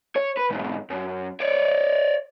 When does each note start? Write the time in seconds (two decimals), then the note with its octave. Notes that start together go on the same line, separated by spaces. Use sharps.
0.16 C#5
0.37 B4
0.50 B1 G#2
0.90 F#2
1.40 C#5 D5